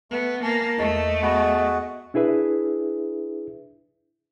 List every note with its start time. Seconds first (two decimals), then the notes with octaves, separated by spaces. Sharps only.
0.11 A3 B3
0.43 A#3 G#5 A5
0.79 E2 A3 D#5 C#6 A6
1.22 B3 F#4 G#4 F#5 B5 A#6
2.14 D4 E4 G#4 B4 E5